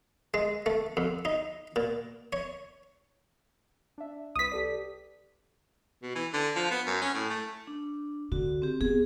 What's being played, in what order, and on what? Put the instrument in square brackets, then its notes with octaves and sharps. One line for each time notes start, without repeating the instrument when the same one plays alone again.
[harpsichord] G#3
A3
F2
D#4
A#2
C#5
[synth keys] D4 E5
[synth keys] C2 B4 [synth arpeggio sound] D#6 B6
[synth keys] G4 A4 D5
[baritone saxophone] B2
E3
D3
F3
B3
F#2
C#4
A2
A3
[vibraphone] D4
[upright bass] D3 [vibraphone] F#4
[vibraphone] C4 G4
[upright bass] B3 [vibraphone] G#4